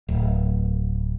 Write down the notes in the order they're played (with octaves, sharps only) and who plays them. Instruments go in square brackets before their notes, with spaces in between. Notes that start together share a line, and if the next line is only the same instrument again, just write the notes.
[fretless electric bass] D1